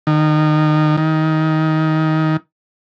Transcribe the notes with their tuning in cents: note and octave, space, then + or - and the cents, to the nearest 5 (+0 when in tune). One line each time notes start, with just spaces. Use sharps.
D#3 -25
D#3 +20